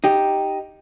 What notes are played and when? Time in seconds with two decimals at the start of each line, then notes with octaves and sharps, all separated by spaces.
0.04 D#4 G4